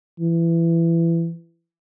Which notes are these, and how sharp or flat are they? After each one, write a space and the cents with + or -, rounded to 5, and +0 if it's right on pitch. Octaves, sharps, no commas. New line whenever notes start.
E3 +20